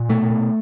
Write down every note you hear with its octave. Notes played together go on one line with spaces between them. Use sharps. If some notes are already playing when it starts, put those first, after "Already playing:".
Already playing: A#2
B2 A3
B2